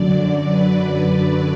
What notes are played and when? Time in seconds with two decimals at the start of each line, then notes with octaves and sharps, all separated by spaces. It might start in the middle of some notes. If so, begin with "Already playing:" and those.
Already playing: F#2 D3 F#3 D5
0.48 B4